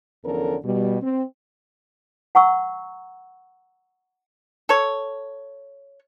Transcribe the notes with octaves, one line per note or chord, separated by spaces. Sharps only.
E2 D3 F3 C#4 A4 A#4
B2 G3
C4
F#5 A#5 C#6 E6
A4 C#5